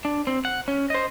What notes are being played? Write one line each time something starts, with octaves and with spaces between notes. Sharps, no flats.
D4
C4
F#5
C#4
C5 D#5